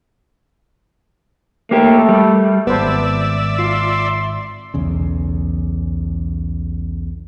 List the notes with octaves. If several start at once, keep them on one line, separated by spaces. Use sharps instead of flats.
A3 A#3 G4
G3
G#1 F2 B3 B4 C5 D5 E5 A5
F4 C6
B1 E2 C#3